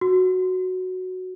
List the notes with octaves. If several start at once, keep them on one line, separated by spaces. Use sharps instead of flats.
F#4